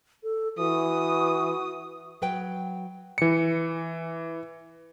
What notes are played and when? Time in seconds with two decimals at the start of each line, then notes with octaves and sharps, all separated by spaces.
0.23 A4
0.59 E3 F#4 D#6
2.22 F#3 B4 G5
3.18 E3 C#7